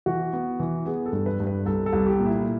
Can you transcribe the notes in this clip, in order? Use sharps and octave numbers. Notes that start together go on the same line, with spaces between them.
E3 F#4
B3
E3
B3 G#4
A4
G2
B4
G2
B4
C2 A4
A4
C2
G4
A#2
E4